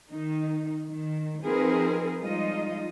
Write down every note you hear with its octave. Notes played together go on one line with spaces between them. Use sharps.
D#3 D#4
D#3
F3 C4 D#4 G#4 A#4 B4
F3 G3 G#3 D#4 F4 D#5